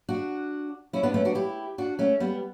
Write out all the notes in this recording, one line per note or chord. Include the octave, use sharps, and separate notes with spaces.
D4 F#4
C#4 E4
B3 D4
A3 C#4
D4 F#4
E4 G4
D4 F#4
A3 C#4
G3 B3